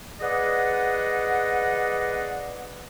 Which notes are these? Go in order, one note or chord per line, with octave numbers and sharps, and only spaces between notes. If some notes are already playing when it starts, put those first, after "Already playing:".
G#4 B4 D5 D#5 F#5